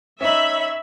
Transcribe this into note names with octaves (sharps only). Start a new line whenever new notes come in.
C#4 D#4 C#5 E5 B5